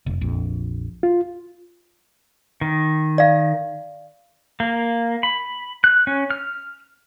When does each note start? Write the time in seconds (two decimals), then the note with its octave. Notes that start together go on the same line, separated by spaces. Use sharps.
0.06 F1
0.21 A#1 F2
1.03 F4
2.61 D#3
3.18 D5 F5
4.60 A#3
5.23 B5
5.84 F#6
6.07 C#4
6.31 F6